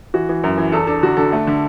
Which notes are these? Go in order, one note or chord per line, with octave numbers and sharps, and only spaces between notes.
E3 F#4
E3
F#2
E3
E2 A4
D4 A4
D3 F#4
D3 A4
A3
D3